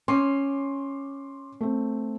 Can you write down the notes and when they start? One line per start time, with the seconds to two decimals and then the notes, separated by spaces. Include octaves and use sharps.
0.08 C#4 C6 D6 C7
1.61 A3 C4